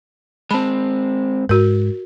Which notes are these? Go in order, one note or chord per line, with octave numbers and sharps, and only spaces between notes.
G#3 C4 A5 B5
G#2 F#4 A#4